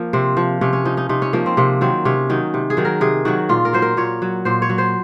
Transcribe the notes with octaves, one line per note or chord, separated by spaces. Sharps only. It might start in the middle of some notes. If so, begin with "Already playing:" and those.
Already playing: F3 A#3
C3 C4
F3
C3 C#4
C#4
F3 D#4
D#4
C3 D#4
C#4
F3 A#3
C4
C3 A#3
D#3 F#3 C4
C3 C#4
D#3 F#3 D#4
C3
G#4
D#3 F#3
A#4
C3 G#4
D#3 F#3 F#4
A#2 F4
A#4
F#3 C5
A#4
A#2 C#5
F#3
A#2 C5
C#5
F#3
C5